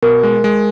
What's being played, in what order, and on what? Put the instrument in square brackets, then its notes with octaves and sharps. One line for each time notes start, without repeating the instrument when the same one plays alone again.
[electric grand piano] B2 [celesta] A#4
[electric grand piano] G#3
G#3